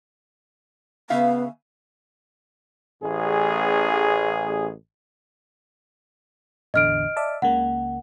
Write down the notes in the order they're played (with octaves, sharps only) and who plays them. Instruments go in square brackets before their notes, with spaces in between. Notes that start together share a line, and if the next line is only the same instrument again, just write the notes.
[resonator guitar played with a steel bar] C#3 E5 F5 [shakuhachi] B3
[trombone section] A1 G#4
[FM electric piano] A1 E2 D3 [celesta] D#5 F6 D7
[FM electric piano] D5 E5 A5
[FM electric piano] C#2 C#3 A#3 [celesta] F#5